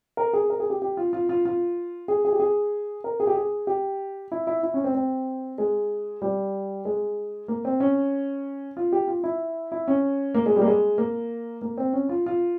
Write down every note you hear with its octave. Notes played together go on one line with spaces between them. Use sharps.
A#4
G#4
A#4
G#4
G4
G4
F4
F4
F4
F4
G#4
G#4
G4
G#4
A#4
G#4
G4
G#4
G4
E4
E4
E4
C#4
C4
C4
G#3
G3
G#3
A#3
C4
C#4
F4
G4
F4
E4
E4
C#4
A#3
G#3
G3
A#3
G#3
A#3
A#3
C4
C#4
F4
F4